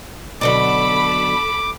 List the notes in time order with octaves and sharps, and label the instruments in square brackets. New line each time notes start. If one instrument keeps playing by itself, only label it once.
[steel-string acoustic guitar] B2 D3 F#3 [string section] A4 B5 [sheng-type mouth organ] D6